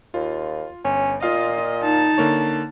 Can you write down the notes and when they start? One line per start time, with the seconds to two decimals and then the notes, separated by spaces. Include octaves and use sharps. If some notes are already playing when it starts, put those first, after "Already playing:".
0.14 D#2 F4
0.84 G1 C#4
1.23 A#2 F4 D#5 F5
1.82 D#4 A5
2.18 D3 A#3 C#5